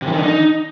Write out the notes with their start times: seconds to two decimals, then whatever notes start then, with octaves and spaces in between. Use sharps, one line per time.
0.02 C3
0.07 E3
0.12 D#3
0.18 D4
0.23 D#4